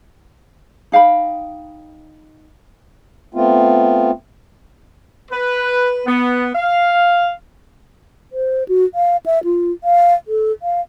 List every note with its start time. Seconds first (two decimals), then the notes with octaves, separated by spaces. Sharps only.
0.92 D#4 F5 G5 B5
3.35 A3 B3 C4 F4
5.31 B4
6.06 B3
6.55 F5
8.32 C5
8.68 F#4
8.95 F5
9.26 E5
9.44 F4
9.84 F5
10.28 A4
10.62 F5